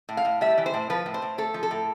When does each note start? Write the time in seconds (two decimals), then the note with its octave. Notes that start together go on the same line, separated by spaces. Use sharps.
0.09 A2
0.17 F5
0.25 A2
0.41 G3 E5
0.58 E3
0.66 C5
0.74 A2
0.90 F3 B4
1.06 A2
1.14 C5
1.22 A2
1.38 A3 A4
1.54 F3
1.63 A4
1.71 A2